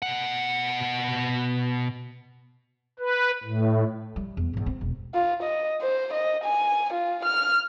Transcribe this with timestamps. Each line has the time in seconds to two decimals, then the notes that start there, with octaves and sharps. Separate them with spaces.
0.02 B2 F#5
2.99 B4
3.44 A2
4.16 G3
4.37 E2
4.53 E2 G#2
4.66 C4
4.81 E1
5.14 F4
5.43 D#5
5.82 C5
6.13 D#5
6.44 G#5
6.93 F4
7.25 F6